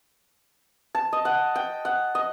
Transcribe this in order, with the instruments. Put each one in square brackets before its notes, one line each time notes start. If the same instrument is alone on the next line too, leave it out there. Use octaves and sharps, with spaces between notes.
[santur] A5
D#5
F#5
G5
F#5
D#5